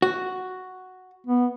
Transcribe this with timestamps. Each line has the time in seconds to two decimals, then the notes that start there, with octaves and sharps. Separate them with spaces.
0.02 F#4
1.27 B3